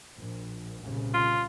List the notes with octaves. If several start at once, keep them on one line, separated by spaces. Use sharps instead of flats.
A#1
C2 A#2 C#3
F4